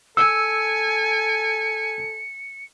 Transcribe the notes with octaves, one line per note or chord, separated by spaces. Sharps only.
A4 G#5 E6 C#7